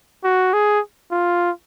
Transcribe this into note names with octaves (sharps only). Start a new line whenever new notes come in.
F#4
G#4
F4